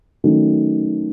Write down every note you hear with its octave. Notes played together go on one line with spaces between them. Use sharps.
D#3 F#3 A3 C#4